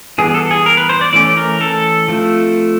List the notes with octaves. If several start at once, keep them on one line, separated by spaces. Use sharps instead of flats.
E3 G3 B3 G#4
A4
G#4
A#4
B4
C5
D5
E3 A3 C#4 D5
A#4
A4
F3 A3 C4